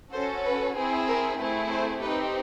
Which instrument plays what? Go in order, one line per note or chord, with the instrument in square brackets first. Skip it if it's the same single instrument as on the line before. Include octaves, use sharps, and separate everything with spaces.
[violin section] C#4 F#4 A4 C5
B4
C4 E4 G#4
A#4
A3 C4 E4 G#4 B4
C5
C4 D#4 G4 B4